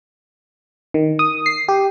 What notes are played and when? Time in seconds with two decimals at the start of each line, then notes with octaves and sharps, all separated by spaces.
0.94 D#3
1.19 D#6
1.46 C7
1.68 G4